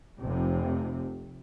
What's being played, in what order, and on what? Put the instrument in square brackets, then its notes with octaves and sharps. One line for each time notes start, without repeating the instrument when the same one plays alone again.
[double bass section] F1 C3